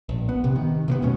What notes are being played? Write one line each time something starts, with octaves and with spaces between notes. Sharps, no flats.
A#1
B3
C3
D#3
C3 A#3 B3
E2 B2 G#3 C#4